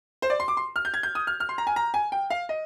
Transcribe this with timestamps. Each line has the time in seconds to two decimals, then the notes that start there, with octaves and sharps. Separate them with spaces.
0.22 C5
0.30 D5
0.40 C6
0.48 D6
0.57 C6
0.76 F6
0.85 G6
0.94 G#6
1.03 G6
1.15 D#6
1.27 F6
1.40 F6
1.49 C6
1.58 A#5
1.67 G#5
1.76 A#5
1.94 G#5
2.12 G5
2.30 F5
2.49 D#5